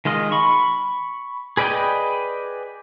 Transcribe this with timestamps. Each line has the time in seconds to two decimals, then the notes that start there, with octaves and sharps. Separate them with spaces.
0.05 D#3 G#3 F4 D#5
0.32 B5 C#6
1.57 G#4 B4 D5 D#5 G5